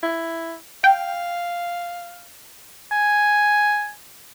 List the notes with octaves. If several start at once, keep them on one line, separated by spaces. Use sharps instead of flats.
E4
F5 G5
G#5